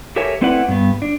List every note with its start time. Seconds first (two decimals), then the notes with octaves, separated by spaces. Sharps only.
0.16 G4 A4 A#4 C#5 E5 G#5
0.41 A3 C4 E4 B4 D5 F#5
0.68 G2 B3
1.02 D4